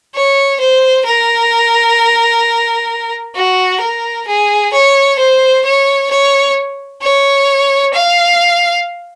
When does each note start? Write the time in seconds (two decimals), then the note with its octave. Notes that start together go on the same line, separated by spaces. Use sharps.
0.15 C#5
0.60 C5
1.06 A#4
3.35 F#4
3.81 A#4
4.28 G#4
4.73 C#5
5.19 C5
5.65 C#5
6.10 C#5
7.02 C#5
7.93 F5